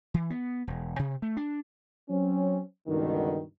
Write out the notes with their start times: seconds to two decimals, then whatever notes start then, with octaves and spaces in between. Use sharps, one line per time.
0.14 E3
0.30 B3
0.67 E1
0.99 C3
1.22 A3
1.37 D4
2.09 F#3 C4 C#4
2.87 C#2 G2 B2 D3 D#3